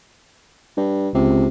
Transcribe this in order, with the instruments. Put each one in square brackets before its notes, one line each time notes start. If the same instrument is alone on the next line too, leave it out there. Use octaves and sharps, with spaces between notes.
[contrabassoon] G2
[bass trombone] C#2 [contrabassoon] C3